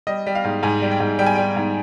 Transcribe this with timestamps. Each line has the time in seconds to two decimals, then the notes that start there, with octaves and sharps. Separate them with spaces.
0.07 G3 D#5
0.27 G3
0.35 F5
0.44 G#2
0.63 G#2 G#5
0.82 G3
0.91 G5
1.00 G#2
1.19 G3 G5
1.26 G#5
1.35 G3 G5
1.56 G#2